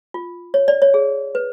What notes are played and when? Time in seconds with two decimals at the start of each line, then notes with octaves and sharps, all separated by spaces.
0.14 F4
0.54 C#5
0.68 D5
0.82 C#5
0.94 G#4
1.35 B4